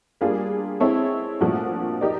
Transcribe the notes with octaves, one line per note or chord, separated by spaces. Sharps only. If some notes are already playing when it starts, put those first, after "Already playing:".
G3 A#3 D4 F4 G#4
G#3 C4 E4 A4 C#5
A#2 F3 A3 D4 F#4
D#4 G4 A#4 D5